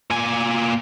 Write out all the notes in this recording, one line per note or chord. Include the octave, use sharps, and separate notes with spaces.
A#2 G#5